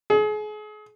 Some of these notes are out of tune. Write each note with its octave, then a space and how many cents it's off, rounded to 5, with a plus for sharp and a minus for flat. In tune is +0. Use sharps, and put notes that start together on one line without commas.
G#4 +35